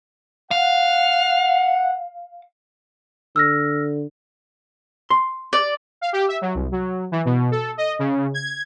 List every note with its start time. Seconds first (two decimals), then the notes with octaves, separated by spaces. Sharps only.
0.51 F5 F#5
3.36 D3 E6 F6 A#6
5.10 C6
5.53 D5
6.01 F5
6.13 G4
6.28 E5
6.41 F#3
6.55 C2
6.72 F#3
7.12 E3
7.25 B2
7.51 A4
7.77 D#5
7.99 C#3
8.34 G#6